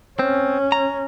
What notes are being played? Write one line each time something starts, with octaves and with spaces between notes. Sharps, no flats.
C4 C#4
A#5